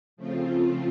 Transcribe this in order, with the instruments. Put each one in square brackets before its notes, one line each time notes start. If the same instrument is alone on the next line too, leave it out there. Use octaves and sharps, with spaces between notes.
[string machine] C#3 F3 A3 C4 F4